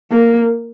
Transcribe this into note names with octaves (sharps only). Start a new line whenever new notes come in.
A#3